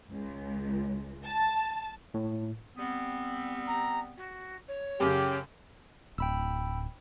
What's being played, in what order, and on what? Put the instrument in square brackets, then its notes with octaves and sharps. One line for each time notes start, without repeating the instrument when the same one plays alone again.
[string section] C#2
A5
[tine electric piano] A2
[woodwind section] G3 B3 C4
[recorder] A#5
F#4
C#5
[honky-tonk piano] F#2 C#3 [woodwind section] G4
[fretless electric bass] D1 [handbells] G5 B5 E6